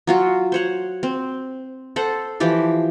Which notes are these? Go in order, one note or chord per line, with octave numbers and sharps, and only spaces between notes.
F#3 F4 F#4
C5 C#5 F#5
C4
A4 C5 F#5
E3 F3 G4 D5